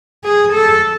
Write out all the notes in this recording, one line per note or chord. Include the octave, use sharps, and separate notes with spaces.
G#4
A4